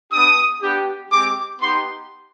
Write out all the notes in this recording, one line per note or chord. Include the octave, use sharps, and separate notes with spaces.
B3 D4 G4 D#6
B3 D4 G4
G#3 C4 G4 D6
B3 D#4 G4 C6